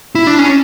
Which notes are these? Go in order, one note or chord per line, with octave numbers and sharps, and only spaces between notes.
E4
D4
C#4